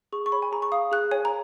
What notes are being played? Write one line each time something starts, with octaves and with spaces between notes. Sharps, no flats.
G#4 C#6
C#6
C#5 B5
G#5
G#4 A#5
C#6
F5 D#6
G#4 F#6
C#5 G#5
A#5